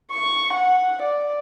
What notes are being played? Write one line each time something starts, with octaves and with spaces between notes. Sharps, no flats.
C#6
F#5
D5